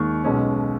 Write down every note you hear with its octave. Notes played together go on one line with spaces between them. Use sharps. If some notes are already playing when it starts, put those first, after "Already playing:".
Already playing: D#2 D#3 G#3 C#6
B1 B2 G#3 C#4